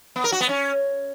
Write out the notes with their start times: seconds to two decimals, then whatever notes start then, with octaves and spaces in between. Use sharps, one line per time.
0.16 B3
0.24 A#4
0.32 F#4
0.41 B3
0.49 C#4